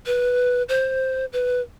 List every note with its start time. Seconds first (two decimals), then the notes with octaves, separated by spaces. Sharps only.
0.06 B4
0.69 C5
1.33 B4